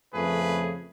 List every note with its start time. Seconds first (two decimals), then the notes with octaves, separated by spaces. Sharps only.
0.14 F2 C#3 A3 G#4 B4